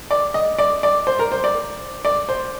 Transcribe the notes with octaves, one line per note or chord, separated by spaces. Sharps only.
D5
D#5
D5
D5
C5
A#4
C5
D5
D5
C5